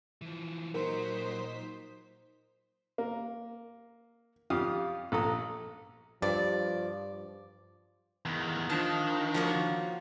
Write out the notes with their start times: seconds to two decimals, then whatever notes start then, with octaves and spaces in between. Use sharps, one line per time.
0.22 E3 F3
0.74 A#2 F#3 D#4 A#4 C5 B6
2.98 A#3
4.50 F2 F4 G4 F5 D#6
5.12 A#1 A4 A#5 D#6
6.22 G2 F3 D5
8.25 E2 D#3
8.70 D#3 F3 D4 A5
9.34 F3 A#3 F#4 C#5